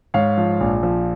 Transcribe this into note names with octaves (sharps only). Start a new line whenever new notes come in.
G#2 C#5 F5
F3
A#1
F3